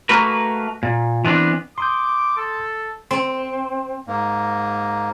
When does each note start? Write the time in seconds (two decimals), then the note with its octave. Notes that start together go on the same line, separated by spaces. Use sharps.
0.09 A3 A#3 F#4 A#4 B4
0.83 A#2
1.25 E3 B3 C4 D4
1.78 C6 D6 D#6 G6
2.37 A4
3.11 C4
4.07 G#2 A#3